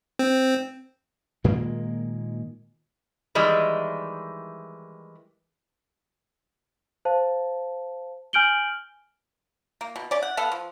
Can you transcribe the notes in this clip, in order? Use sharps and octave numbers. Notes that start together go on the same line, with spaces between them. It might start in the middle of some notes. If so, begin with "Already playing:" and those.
C4
A#2 D#3 G#3 A#3
D#3 E3 G3 G#3
C5 F5 A5
G#5 F6 G6 D7 F#7 G7
A#3
B2
C#4 D5
F#5
B3 A4 F5 F#5
F3